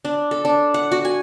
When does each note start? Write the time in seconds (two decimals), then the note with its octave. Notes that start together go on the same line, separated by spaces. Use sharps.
0.05 D4
0.31 A4
0.45 D4
0.74 F#5
0.92 F#4
1.05 G#5